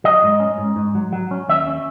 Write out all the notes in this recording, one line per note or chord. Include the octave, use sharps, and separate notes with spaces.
F#3 D#5
G#2
C#4
G#2
G#2
F#3
F#3
C#4
D#2 E5
C#4